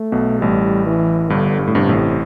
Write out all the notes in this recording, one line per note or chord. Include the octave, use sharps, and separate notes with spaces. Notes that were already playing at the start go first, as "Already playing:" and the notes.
Already playing: A3
B1 B2
A1 A2 G3
E3
G1 G2 D3
G2
A2
G1 G2 C3
A1 A2